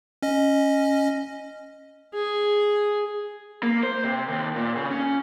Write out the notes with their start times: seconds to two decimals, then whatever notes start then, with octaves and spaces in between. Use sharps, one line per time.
0.22 C#4 D#5
2.14 G#4
3.63 A#3
3.83 C5
4.04 C3
4.28 D#2
4.56 A#2
4.76 C#3
4.91 C#4